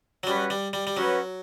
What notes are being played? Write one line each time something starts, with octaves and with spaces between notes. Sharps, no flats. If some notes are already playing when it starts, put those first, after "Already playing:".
F#3
G3 C#4 F#4 B4
G3
G3
G3
F#3 C#4 F#4 B4